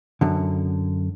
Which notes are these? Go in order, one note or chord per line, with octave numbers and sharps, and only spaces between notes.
F#2 D3